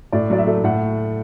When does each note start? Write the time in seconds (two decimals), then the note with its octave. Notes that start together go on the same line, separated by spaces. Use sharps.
0.12 A2 D5
0.30 F#3 D5
0.38 E5
0.47 A3
0.64 A2 F#5